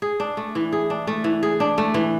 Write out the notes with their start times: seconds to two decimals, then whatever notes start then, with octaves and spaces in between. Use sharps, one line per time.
0.02 G#4
0.20 D4
0.37 A3
0.55 E3
0.72 G#4
0.90 D4
1.07 A3
1.24 E3
1.43 G#4
1.60 D4
1.78 A3
1.94 E3